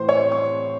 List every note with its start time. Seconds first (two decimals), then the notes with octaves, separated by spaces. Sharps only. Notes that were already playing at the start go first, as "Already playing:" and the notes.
Already playing: A2 E3 C5 C6
0.09 C#5 C#6
0.32 C#6